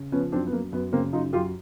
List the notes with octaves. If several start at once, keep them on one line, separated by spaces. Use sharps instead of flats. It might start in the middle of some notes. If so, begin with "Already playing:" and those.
Already playing: C#3
F3 B3 C#4
F#2 C4 D4
B3
F#2 A#3
F#2 B3
C#3 A#3 C4
F#2 D#4 F4
F#2 F4 G4